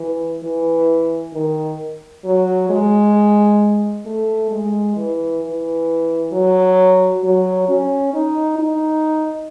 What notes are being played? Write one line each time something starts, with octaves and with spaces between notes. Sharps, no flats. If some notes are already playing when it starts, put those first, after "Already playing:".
Already playing: E3
E3
D#3
F#3
G#3
A3
G#3
E3
E3
F#3
F#3
C#4
D#4
D#4